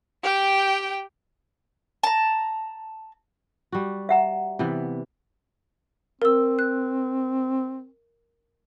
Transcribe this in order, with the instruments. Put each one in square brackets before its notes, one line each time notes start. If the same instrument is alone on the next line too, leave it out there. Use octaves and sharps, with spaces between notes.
[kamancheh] G4 G5
[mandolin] A5 A#5
[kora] G3 F#4
[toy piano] E5 F#5 A#5
[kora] C3 E3 B3
[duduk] C4 [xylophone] A#4 E6
[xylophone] F#6